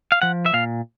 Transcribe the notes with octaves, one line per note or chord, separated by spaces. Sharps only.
F5
F3 F#5
E5
A#2 F5